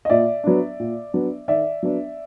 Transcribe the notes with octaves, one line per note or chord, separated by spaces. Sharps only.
D#5
A#2 D5 E5
F#3 B3 D4
A#2
F#3 B3 D4
D#3 D5 E5
F#3 B3 D4